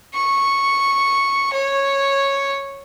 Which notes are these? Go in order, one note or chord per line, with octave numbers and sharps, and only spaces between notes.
C#6
C#5